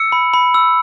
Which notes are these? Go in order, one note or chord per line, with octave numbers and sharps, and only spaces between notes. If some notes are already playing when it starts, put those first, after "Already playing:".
Already playing: E6 C#7
B5
B5
E6